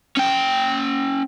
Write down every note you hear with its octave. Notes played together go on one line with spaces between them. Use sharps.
C#4 G5